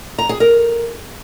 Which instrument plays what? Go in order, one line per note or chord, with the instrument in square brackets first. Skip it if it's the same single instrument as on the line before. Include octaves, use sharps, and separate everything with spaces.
[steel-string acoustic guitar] A#5
G#4
A#4